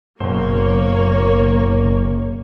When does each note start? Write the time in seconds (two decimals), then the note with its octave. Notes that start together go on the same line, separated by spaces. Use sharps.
0.20 F#1 B2 A#3 C5 C#5